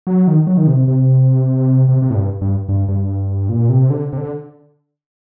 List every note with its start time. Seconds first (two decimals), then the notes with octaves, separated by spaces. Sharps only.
0.07 F#3
0.28 D#3
0.47 F#3
0.57 D#3
0.67 C3
0.88 C3
1.89 C3
2.02 C3
2.10 A2
2.15 G2
2.41 G2
2.69 G2
2.89 G2
3.49 A#2
3.69 C3
3.90 D3
4.13 C3
4.17 D3